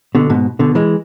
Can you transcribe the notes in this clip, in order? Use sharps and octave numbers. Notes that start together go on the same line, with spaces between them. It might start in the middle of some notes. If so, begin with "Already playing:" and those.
B2 D3
G#2 B2
B2 D3
E3 G#3